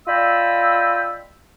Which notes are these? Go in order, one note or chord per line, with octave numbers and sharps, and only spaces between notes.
F4 D5 D#5 G5 B5 E6